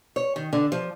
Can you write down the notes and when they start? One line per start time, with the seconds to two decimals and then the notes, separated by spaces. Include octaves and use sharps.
0.16 C#5
0.36 D#3
0.53 D3
0.72 F3